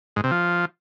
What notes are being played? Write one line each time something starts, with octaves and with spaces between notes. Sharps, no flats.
G#2
C3
F3